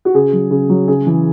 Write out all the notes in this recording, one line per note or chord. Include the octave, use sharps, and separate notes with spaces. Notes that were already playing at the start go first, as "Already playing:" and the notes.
F#4
C#3 G#4
F#3
C#3
F#3
C#3 G#4
E3